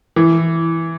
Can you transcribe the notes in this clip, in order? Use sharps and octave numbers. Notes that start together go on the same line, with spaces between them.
E3